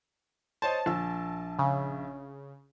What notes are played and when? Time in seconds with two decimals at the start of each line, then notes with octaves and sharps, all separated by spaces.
0.62 C5 C#5 D#5 A5
0.86 A#1 E6
1.59 C#3